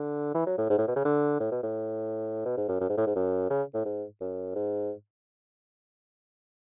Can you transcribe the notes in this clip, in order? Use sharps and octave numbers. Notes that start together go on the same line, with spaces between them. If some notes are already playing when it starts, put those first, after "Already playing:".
Already playing: D3
E3
F#3
A2
G#2
A2
B2
C#3
D3
A2
B2
A2
B2
G#2
F#2
F#2
G#2
A2
G#2
F#2
C#3
A2
G#2
F#2
G#2